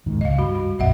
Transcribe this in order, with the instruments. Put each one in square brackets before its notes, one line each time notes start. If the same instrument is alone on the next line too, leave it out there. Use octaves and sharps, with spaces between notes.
[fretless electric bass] E1 G#2 D#3
[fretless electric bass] C#2 [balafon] D#5 F5
[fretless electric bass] G2 [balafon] F#4 B5
[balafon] F#4
[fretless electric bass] A#1 F2 [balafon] D#5 E5 F#5